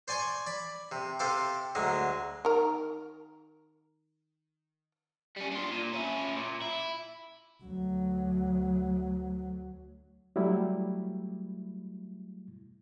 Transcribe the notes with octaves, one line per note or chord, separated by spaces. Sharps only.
C5 D5 G#5 C6 C#6
D5 B5
C3
C3 A4 C5 F5 D6
D2 F#3 G#3
D#3 A#4
G3 C#4
D4 F4
A#2
C#4 E4
A#2
E4
D2 F#3
F#3 G3 A3 E4